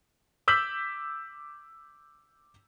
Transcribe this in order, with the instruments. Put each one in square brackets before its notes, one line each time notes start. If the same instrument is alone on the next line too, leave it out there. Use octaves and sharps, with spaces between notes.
[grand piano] D6 E6 G6 B6 F#7